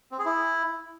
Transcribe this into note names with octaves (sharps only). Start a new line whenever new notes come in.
C4
G#4
E4